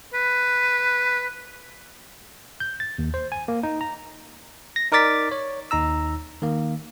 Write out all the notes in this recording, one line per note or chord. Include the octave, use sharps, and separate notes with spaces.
B4
G6
A6
D#2
C5
G#5
A#3
D#4
A#5
A#6
D#4 A#4 D5 D6 A6 B6
C#5
D#2 D#4 A#5 E6
D#3 A#3